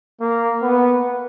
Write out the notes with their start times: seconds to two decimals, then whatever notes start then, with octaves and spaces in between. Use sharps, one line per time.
0.21 A#3
0.62 B3